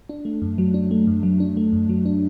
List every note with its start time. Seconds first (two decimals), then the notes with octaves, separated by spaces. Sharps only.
0.09 D4
0.25 A3
0.42 F#2
0.58 F#3
0.74 D4
0.91 A3
1.07 F#2
1.23 F#3
1.40 D4
1.57 A3
1.73 F#2
1.89 F#3
2.06 D4